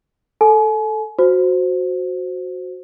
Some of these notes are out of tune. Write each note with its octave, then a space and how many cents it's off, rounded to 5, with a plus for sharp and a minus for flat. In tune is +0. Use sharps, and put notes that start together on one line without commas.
A4 +0 G#5 +40
F#4 -10 C5 -5